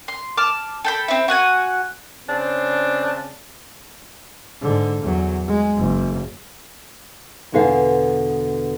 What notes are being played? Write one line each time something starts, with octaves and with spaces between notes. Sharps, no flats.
C6
A5 D6 F6
A4 G5 B5
C4 E4
F#4 F#5 G#5
C#3 C4 D4
G#2 D3
E2 F#3
G#3
F#1
E2 B2 D3 G#4 B4 F5